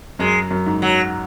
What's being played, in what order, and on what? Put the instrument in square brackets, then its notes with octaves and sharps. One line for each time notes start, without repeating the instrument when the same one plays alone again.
[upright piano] F#2 [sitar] G#3
[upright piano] F#2
G#2
[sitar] F#3